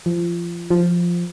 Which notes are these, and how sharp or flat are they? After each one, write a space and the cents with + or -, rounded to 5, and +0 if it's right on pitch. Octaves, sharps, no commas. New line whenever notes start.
F3 -25
F3 +0